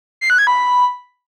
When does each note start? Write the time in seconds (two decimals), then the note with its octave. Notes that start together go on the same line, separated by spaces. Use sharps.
0.21 C7
0.30 F#6
0.38 G#6
0.47 B5